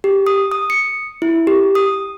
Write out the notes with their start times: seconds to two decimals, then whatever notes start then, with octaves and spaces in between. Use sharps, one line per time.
0.04 G4
0.27 D#6
0.52 D#6
0.70 C#7
1.22 E4
1.47 G4
1.75 D#6